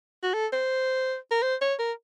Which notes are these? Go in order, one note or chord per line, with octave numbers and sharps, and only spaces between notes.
F#4
A4
C5
A#4
C5
C#5
A#4